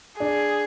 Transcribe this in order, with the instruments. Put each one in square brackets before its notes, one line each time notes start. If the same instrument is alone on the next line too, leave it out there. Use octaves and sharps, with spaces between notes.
[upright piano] D4 [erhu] G#4